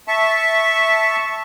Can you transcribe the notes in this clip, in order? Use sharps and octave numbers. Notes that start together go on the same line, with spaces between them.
E5 A5 C#6